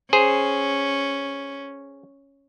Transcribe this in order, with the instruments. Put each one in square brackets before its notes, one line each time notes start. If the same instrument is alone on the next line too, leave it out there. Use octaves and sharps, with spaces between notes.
[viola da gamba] C#4 [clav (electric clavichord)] G#4 C5